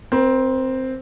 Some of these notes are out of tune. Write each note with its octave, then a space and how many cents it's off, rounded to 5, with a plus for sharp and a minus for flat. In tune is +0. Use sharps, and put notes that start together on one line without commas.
C4 +0 A#4 +40